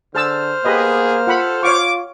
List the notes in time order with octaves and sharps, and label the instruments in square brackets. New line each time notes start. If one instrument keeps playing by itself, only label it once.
[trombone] D3 [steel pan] G#4 A5 E6 [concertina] C5 F6
[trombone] A#3 [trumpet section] B3 G#4 [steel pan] G4 B4 D#5
[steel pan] F4 F#5 B5 [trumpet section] A4
[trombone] F4 [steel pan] C#5 F5 C#6 [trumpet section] D6